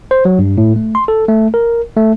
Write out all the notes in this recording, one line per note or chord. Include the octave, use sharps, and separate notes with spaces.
C5
F#3
G2
A2
A3
C6
A4
A3
A#4
A3